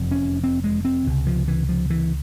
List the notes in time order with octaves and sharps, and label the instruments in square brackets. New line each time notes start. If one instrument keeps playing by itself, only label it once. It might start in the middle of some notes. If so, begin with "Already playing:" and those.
Already playing: [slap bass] F1 E2 C3
C#4
C4
G#3
C4
C#2 C3
F3
E3
F3
E3